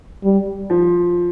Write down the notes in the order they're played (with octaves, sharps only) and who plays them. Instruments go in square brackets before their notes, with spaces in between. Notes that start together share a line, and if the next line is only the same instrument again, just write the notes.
[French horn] G3
[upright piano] F3